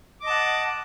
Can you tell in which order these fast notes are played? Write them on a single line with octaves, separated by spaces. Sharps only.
D6 D#5 A5 F#5